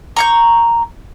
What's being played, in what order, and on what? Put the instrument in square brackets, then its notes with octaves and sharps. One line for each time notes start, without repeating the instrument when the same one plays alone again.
[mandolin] A#5 C#6 G6